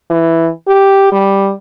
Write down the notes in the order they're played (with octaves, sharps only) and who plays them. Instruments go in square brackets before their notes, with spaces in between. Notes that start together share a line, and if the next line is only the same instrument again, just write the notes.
[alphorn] E3
G4
G3